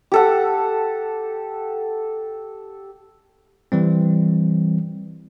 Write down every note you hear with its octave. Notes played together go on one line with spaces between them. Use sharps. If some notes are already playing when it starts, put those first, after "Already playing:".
G4 A4 F#5
E3 G3 C4